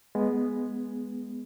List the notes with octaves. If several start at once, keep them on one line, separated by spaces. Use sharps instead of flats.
G#3 B3